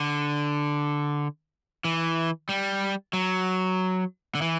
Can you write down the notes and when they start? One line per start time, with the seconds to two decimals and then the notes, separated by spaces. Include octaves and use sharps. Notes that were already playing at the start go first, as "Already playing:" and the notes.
Already playing: D3
1.84 E3
2.49 G3
3.13 F#3
4.35 D3
4.42 E3